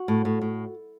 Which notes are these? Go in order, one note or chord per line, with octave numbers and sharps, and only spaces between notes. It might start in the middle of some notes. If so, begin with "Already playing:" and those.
Already playing: F#4
A2
A2
A2